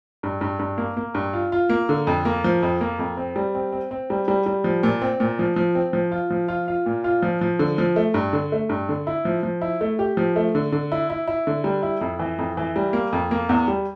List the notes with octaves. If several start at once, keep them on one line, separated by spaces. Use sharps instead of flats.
G2
G2
G2
A#3
A#3
G2
F4
F4
A#3
D3
F2
A#3
F3
F2
A#3
F2
C4
G3
C4
C4
C4
G3
G3
G3
F3
A#2
C4
A#2
F3
F3
C4
F3
F4
F3
F4
F4
A#2
F4
F3
F3
D3
F3
A3
G2
D3
A3
G2
D3
E4
F3
F3
E4
A3
G4
F3
A3
D3
D3
E4
E4
E4
D3
G3
E4
F2
E3
F2
E3
G3
A#3
F2
A#3
E2
G3